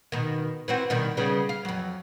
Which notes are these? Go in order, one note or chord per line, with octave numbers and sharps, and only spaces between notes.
B2 D#3
E3 C4 F#4
B2 D#3 G3
C#3 G3 B3
F5
F2 F#3